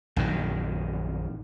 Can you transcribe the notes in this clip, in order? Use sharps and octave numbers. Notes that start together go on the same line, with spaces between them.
A#1 F#2 D#3